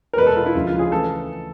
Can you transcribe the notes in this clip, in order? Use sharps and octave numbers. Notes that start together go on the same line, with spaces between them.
A#4
E2 B2 G#3 B4
A4
F4
E4
D2 C#3 F3 G#3 F4
F4
G#4
C#3 E3 A3 A4